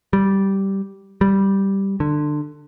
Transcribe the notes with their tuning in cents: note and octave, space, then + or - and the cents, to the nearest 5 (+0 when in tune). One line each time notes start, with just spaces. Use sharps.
G3 -10
G3 -5
D3 +25